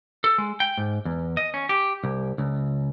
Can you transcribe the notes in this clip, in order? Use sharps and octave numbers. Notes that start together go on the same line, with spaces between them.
A4
G#3
G5
G#2
E2
D#5
C#4
G4
C2
C#2